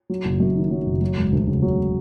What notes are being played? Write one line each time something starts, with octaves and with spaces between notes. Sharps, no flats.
F#3
F#1
F#2
D#3
F#3
F#1
F#3
E1
D2
C#3
F#3